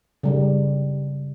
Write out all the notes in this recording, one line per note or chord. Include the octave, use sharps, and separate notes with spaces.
C#3 G3